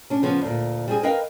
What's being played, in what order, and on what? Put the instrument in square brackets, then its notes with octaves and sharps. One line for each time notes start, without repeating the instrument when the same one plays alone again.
[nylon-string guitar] C#4 D4
C#3 F3 B3 C#4
D2 A#2
G3 C4 G#4
A#4 B4 D#5 F5 G5